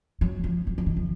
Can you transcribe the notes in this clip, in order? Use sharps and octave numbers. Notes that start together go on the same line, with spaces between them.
F#3
F3
F#3
F3
D#3
F3